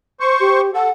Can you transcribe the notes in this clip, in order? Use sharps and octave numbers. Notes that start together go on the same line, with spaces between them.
C5 C#6
G4
A4 F#5